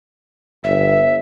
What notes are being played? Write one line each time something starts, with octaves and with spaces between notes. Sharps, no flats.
G1 E5